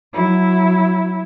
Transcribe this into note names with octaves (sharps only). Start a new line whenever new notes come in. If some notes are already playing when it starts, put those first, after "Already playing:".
F#3 E4